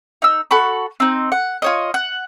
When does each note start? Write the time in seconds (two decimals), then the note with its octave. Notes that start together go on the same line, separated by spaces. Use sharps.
0.22 D#4 E6
0.51 F#4 A4 B5 C#6
1.00 C4 D#4
1.32 F#5
1.62 F4 C#5 D#5
1.94 F#5